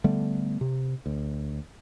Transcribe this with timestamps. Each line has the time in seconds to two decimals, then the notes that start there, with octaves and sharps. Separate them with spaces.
0.04 D3 G3 A3 B3
0.61 C3
1.06 D2